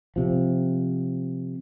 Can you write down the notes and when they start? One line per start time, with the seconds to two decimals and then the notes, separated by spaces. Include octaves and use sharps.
0.16 C3 F3